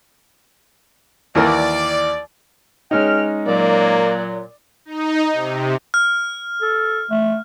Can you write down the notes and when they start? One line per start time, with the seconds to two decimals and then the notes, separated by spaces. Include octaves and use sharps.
1.35 D#2 E3 A#4 D5
2.91 C#2 G#3 C#4 D#4 G5 F6
3.46 A#2 F#3 A#3 D5
4.85 D#4
5.33 C3
5.94 F6
6.62 A4
7.11 A3